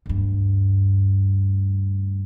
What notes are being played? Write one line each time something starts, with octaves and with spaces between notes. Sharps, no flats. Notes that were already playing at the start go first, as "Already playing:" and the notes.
D2 G2